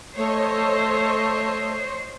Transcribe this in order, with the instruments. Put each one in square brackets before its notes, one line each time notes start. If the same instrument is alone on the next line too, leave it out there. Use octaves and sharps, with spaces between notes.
[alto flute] A3 [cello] C5 [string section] C#5 D#5